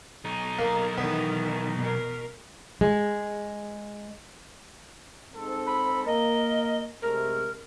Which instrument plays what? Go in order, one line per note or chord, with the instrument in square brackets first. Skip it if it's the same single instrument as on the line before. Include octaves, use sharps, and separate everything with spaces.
[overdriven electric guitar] B1 D#4
[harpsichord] A#3 [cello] A#4
[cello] D#3 E3 [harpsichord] B3
[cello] B2 A#4
[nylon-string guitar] G#3
[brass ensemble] G#2 C4 A4
[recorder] B5
[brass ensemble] A#3 A#4 [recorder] D#5
[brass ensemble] C3 G#3 A3 [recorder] A#4